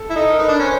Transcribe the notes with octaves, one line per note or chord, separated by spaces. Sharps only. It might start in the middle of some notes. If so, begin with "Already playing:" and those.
Already playing: A4
E4
D#4 A4
A#4
D#4 B4
D4
C#4 C5